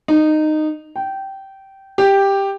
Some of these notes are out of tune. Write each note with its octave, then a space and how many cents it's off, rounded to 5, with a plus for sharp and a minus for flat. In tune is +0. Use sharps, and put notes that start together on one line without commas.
D#4 -15
G5 -15
G4 +5